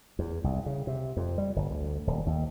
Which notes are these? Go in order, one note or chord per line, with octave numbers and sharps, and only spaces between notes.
E2
C2
C#3
C3
F2
G3
G1
D2
D#1
D#2